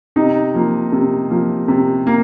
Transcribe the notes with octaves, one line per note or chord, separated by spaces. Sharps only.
C3 D#4 D#5
F3 A#3
C3
F3 A#3
C3
A#3